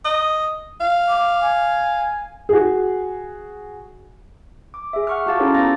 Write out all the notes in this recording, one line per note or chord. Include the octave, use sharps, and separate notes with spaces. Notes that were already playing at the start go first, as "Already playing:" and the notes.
D#5
F5
D6
G#5
F#4 G#4
D6
G#4 E5
F#5 C#6 F6
F4 F#4 F5 A5 D6 A6
C#4 D#4 E4 G#4 A4 C#5
B3 F4 F5 A#5 A6 A#6